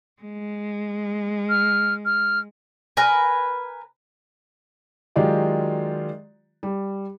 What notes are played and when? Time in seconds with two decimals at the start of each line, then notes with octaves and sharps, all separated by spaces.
0.22 G#3
1.49 F6
2.05 F6
2.97 A#4 B4 G#5
5.16 D#3 F#3 G#3 F4 G4 D5
6.63 G3